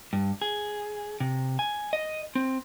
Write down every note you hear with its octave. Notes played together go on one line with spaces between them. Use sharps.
G2
G#4
C3
G#5
D#5
C4